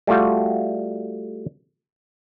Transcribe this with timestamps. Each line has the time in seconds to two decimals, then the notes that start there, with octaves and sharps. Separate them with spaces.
0.07 G3 A3 F4 F#4